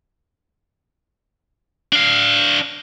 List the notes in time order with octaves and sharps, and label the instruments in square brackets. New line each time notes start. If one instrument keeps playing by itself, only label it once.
[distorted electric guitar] D4 F5